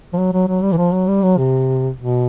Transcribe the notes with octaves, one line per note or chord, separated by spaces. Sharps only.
F3
F#3
F#3
F#3
G3
E3
F3
F#3
G3
F#3
C3
B2